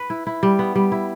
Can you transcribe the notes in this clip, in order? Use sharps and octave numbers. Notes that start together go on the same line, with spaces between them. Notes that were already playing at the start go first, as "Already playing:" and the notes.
Already playing: B4
E4
E4
G3
B3
G3
E4